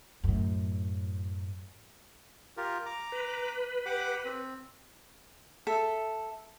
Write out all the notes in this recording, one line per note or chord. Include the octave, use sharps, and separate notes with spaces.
F#2 A2
F4 G4 A#4
A#5 D6
B4
G4 F#5 D6
C4
A4 E5